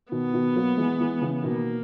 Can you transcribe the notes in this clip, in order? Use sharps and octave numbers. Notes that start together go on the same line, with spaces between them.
B2 D#3 B3
B2 D#3
F#3 A#3
E3 G#3
E3 G#3
C#3 E3
B2 D#3 A#3